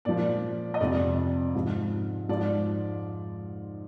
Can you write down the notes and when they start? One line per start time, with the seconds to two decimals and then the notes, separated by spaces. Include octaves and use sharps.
0.05 A#2 F3 D5
0.74 D#5
0.80 F2 C3 F3 D5
1.54 G#2 F3
2.29 G#2 F3 D5